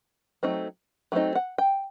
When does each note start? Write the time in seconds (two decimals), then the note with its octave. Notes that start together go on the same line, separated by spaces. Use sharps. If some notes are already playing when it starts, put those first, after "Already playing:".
0.43 F#3 A3 C4 D#4
1.12 F#3 A3 C4 D#4
1.35 F#5
1.58 G5